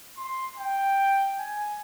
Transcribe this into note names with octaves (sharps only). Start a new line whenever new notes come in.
C6
G5
G#5